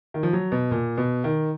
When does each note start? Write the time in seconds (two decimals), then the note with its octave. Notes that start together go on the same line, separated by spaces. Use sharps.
0.14 D#3
0.23 F3
0.33 F#3
0.52 B2
0.71 A#2
0.97 B2
1.24 D#3